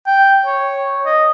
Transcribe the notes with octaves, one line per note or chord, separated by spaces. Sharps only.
G5
C#5
D#5